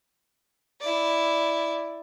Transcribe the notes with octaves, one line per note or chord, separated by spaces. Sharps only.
E4 D5